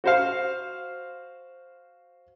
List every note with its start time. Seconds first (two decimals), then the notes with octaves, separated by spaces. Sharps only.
0.04 F#4 C5 F5